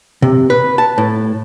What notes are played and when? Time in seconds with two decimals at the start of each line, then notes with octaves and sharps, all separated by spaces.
0.22 C3
0.50 B4
0.78 A5
0.98 A2